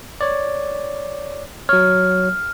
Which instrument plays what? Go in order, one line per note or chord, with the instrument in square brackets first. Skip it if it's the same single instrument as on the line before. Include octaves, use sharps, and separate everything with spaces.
[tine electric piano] C#5 D5
[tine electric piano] F#3 C#5 [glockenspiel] F6